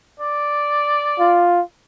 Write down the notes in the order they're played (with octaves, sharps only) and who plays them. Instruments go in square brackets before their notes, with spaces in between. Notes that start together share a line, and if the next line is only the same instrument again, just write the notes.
[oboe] D5
[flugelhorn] F4